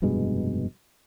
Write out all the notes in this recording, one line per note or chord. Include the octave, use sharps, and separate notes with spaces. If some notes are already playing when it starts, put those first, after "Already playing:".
F1 G2 B2 G#3